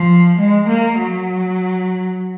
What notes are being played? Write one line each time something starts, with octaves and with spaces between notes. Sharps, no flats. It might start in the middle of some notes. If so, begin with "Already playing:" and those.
Already playing: F3
G#3
A#3
F#3